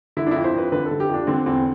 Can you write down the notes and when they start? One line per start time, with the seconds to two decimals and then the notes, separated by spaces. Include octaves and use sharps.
0.17 D3 E4
0.27 D4
0.31 F2 E4
0.44 C5
0.54 F2 B4
0.72 D3 B4
0.86 A4
0.91 D3
1.00 G4
1.09 F2 D4
1.27 D3 C4
1.46 E2 C4